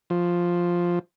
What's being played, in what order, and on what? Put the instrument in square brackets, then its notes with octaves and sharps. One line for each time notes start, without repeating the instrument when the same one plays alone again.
[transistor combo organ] F3